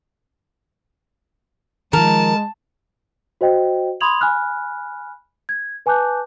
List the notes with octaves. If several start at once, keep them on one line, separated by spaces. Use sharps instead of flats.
D#3 F3 G#3 A#4 A5
F#4 C5 D#5 G5
B5 C6 D#6 G#6 F7 F#7
G#5 B5 F6 F#6
G#6
B4 G#5 A5 D6 F#6 G6